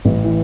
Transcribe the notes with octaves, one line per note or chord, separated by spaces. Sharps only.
A1
E3